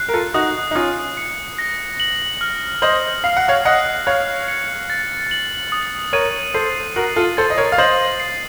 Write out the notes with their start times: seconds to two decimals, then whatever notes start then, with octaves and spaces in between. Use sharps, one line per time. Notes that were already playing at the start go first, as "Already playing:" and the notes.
Already playing: F#6 C7
0.09 A#4
0.14 F4 A4
0.34 D#4 F#4 D#6
0.71 D#4
0.75 C#4 F4 D#6
1.17 C#7
1.58 A#6
2.00 F#7
2.41 F6
2.82 C5 D#5 F#7
3.24 F5 C7
3.37 F#5
3.48 C#5 F5
3.65 D#5 F#5 F#6
4.06 C#5 F5 F#6
4.48 C#7
4.90 A6
5.31 F#7
5.72 D#6
6.13 A#4 C#5 D#7
6.54 A4 C5 C7
6.96 F#4 A#4 F#7
7.16 F4 A4
7.37 A4 C5 A6
7.50 D#5
7.58 A#4 C#5
7.72 F5
7.78 C5 D#5 F#7
8.20 C7